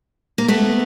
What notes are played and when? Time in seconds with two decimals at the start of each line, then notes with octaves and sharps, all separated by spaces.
0.38 A#3
0.48 A3 B3